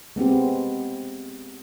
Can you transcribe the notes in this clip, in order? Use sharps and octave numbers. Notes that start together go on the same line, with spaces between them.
G#3 B3 C4 G4